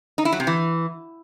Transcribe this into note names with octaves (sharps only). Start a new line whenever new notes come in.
D#4
E4
F#3
C3
E3